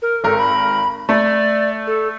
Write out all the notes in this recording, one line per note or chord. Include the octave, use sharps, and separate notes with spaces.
A#4
G#1 A4 A#4
B5
A3 D5
A4